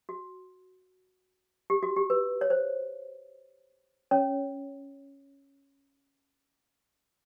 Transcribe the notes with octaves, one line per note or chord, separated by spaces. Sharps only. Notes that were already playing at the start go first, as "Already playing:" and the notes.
F#4
G4
F#4
G4
B4
C#5
C5
C#4 C#5